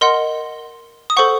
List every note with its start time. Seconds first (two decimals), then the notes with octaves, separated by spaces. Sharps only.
0.01 A#4 D#5 F#5 C6
1.10 D#6
1.17 A4 C5 F#5 C#6